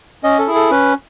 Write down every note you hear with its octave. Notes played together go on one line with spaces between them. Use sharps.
C#4 D#5
A4
E4 G#4
A4
C#4 B4